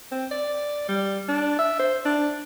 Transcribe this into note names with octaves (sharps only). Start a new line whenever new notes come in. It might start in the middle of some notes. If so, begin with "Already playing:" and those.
C4
D5
G3
D4
E5
C5
D4